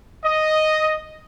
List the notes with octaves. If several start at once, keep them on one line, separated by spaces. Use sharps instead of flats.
D#5